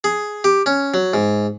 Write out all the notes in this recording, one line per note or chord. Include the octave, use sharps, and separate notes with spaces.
G#4
G4
C#4
F#3
G#2